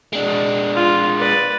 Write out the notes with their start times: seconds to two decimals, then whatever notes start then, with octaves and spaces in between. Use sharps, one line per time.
0.13 G#3 D4
0.74 F4
1.18 B4 D5